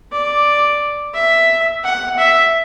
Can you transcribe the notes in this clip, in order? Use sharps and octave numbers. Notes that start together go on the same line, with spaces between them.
D5
E5
F#5
E5